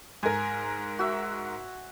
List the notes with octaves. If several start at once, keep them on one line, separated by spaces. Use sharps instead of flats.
G#2 A#4 G#5
F#4 E5